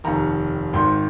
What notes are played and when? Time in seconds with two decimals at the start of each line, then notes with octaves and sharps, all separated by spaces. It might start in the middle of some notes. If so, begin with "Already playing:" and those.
0.04 F1 D#2 D#3 A#5
0.73 G#1 G#2 D#3 C6